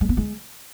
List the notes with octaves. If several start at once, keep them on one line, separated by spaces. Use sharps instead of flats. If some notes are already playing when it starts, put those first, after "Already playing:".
G#3
B3
G#3